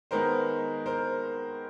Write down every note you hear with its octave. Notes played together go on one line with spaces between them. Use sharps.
D#3 G#3 B3 D#4 A#4 C5
A#4 C5